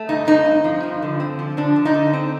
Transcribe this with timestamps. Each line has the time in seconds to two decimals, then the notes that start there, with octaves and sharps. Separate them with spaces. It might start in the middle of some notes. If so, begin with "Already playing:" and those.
Already playing: A3
0.09 G2 D#4
0.27 G2 D#4
0.46 C4
0.64 F3
0.83 G2
1.02 D3
1.20 C4
1.39 F3
1.57 D3 D4
1.76 D3
1.85 D#4
1.94 D3
2.13 C4